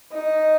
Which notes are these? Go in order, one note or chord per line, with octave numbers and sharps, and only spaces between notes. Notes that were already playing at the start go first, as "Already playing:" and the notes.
D#4